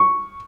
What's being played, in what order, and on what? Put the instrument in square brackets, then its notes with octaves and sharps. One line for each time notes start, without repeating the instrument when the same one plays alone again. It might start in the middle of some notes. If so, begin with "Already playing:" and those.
Already playing: [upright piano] C#6